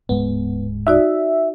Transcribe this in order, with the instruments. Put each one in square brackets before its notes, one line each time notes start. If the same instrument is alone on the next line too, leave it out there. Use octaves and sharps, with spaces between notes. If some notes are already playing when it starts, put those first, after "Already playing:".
[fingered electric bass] D1 G#2 G#3 [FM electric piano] B3
[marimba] D#4 F#4 D5 [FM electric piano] E5